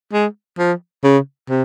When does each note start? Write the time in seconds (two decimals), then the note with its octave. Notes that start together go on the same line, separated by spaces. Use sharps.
0.13 G#3
0.58 F3
1.04 C#3
1.49 C3